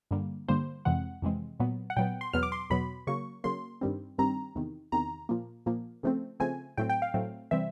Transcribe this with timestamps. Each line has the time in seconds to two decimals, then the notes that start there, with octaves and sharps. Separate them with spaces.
0.11 G2 D3 G3 A#3
0.48 G2 D3 G3 A#3 C5
0.85 F2 C3 E3 G#3 C4 F#5
1.22 F2 C3 E3 G#3 C4
1.60 A#2 F#3 B3
1.90 F#5
1.97 A#2 F#3 B3 G5
2.21 C6
2.33 E2 B2 F#3 B3 F6
2.43 D6
2.52 C6
2.70 E2 B2 F#3 B3 B5
3.07 C#3 F#3 A#3 C#6
3.44 C#3 F#3 A#3 C6
3.81 G2 D#3 G3 C4
4.18 G2 D#3 G3 C4 A#5
4.55 E2 C3 D#3
4.92 E2 C3 D#3 A#5
5.29 A#2 F3 A#3
5.66 A#2 F3 A#3
6.03 C#3 F3 A3 C4
6.40 C#3 F3 A3 C4 G#5
6.77 A2 F#3 A3 C4 G5
6.89 G5
7.02 F5
7.14 A2 F#3 A3 C4
7.51 C3 E3 G3 C4 E5